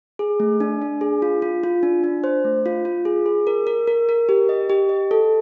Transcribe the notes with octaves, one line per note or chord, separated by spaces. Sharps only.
G#4
A3
D4
D4
G#4
F4
F4
F4
D4
D4
C5
A3
F4
F4
G#4
G#4
A#4
A#4
A#4
A#4
G4
D#5
G4
D#5
A4